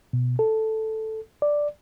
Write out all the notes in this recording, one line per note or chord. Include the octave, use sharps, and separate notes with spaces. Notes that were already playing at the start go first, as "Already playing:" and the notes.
B2
A4
D5